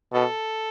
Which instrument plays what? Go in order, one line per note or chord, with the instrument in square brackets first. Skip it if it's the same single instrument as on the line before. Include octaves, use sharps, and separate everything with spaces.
[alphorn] B2 [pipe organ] A4